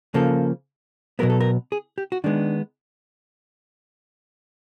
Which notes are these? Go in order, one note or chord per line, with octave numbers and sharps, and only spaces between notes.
C#3 F3 A#3 A4
B2 F#3 B3 A#4
A4
A#4
G#4
G4
F#4
D#3 G#3 B3 D4